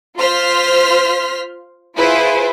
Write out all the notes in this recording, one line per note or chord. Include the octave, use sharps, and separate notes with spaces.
F4 C5 C6 F6 B6
E4 F4 G#4 B4 C5